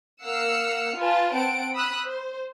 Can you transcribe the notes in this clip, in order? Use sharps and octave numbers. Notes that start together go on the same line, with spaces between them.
A#3 F#5 E6 F6 C7 C#7
F4 B4 G#5 A5
C4 F#5 A5 D7
B5 D#6 E6 F#6
C5